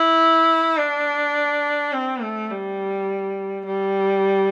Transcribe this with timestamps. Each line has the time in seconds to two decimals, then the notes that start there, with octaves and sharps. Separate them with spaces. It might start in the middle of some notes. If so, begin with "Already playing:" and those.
Already playing: E4
0.77 D4
1.93 C4
2.22 A3
2.50 G3
3.66 G3